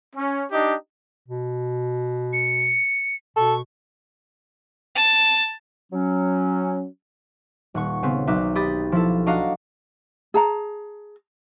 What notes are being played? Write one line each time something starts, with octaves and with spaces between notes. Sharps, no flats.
C#4
D4 D#4 G4 D#5
B2
C#7
B2 A4 C#6
A5
F#3 C#4
D#1 F#5 C#6
C#3 B3 C4
B1 D#4 E5 D6 F#6
G4 B5 D#6 A6
F3 E4 A4
D4 F#4 D#5 F5 F#5 A#5
G#4 A5 A#5